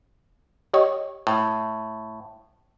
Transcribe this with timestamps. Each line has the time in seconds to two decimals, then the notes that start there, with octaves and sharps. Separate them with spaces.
0.74 G4 C#5 D#5
1.27 A2